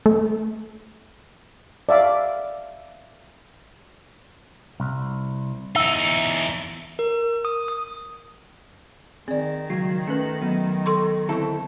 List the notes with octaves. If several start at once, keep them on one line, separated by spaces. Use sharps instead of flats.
A3
D5 E5 F5 D6
C2
E2 D#4 E5
A#4
D#6
D#6
D#3 C4 G#4 D5
C#2 F#3 G#6 C7
A3 C#4 B4 C#7 F#7
F#3 B3 D#5
A4 C6 C#6
D3 C4 E4 A4 C#6